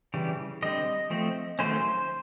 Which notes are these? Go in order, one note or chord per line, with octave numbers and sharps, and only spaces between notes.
C#3 E3 G3
D3 G3 C4 D#5
F3 A3 C4
D#3 F#3 A3 C#4 C5